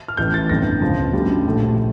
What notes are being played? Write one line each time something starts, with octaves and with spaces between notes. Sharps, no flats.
F6
A1 A2 E3 A3 G6
A6
G1 F2 D3 A#6
C#2 C#3 F3
D2 C#3 G3
A#1 A2 F3 A3